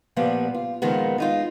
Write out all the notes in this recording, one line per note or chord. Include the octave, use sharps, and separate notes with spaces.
A#2 F3 G3 B3
F4
A#2 D#3 F3 G#3 B3
G#3 D#4 F4